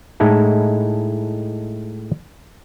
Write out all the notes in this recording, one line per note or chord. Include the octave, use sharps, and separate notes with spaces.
A2 G#3 D#4 E4 A4